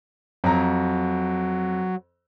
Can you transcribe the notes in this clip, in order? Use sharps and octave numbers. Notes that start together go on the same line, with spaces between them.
F2 F#3 A#5